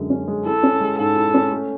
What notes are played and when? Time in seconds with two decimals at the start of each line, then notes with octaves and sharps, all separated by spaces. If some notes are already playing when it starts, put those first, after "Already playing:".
Already playing: F#2 D3 G#3
0.10 C#4
0.28 G#3
0.45 E4 A4
0.63 C#4
0.80 G#3
0.98 G#2 A4
1.16 E4
1.34 C#4
1.52 A3